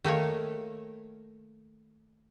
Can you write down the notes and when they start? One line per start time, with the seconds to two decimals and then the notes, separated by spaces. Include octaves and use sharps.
0.04 D#3 A3 A#3 C#5